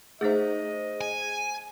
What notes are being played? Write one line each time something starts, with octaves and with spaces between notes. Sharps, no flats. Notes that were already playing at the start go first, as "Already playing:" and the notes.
A3 D#4 G#4 C5 D#5 E5
G#5